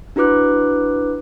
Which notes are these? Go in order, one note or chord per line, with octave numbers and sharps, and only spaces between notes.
D4 E4 F#4 B4 D6 F#6